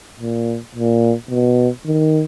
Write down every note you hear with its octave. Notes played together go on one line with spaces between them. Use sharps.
A#2
A#2
B2
D#3